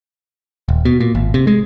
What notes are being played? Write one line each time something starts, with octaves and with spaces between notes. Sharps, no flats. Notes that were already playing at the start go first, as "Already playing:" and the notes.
D#1
B2
A#2
G#1
C3
G#3